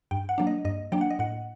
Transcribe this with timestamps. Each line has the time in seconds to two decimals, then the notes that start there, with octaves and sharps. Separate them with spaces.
0.11 G2 G5
0.29 F#5
0.38 F#3 A#3 D4
0.47 D#5
0.65 G2 D#5
0.92 F#3 A#3 D4 G5
1.01 F#5
1.11 D#5
1.19 A2 F#5